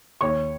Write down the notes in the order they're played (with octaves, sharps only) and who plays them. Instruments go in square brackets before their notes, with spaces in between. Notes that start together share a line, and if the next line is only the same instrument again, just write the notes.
[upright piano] D#2 C#5 C#6